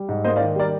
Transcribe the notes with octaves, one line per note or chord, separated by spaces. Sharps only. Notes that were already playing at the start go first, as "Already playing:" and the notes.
Already playing: G3
G#2
A#3 C5 D#5
D5 F5
D#3
G3 A#4 D5